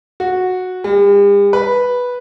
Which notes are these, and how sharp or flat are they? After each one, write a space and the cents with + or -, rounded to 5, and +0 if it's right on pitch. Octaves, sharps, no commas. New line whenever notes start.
F#4 -10
G3 +45
B4 -5